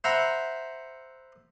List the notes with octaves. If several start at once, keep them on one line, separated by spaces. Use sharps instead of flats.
C5 E5 F#5 A#5 B5